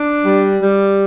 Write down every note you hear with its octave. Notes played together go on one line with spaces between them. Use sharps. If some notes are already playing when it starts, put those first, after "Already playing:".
Already playing: D4
G3
G3